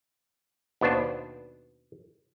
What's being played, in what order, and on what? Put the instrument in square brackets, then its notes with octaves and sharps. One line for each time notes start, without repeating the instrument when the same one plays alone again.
[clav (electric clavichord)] D#2 B2 B3 D4 C5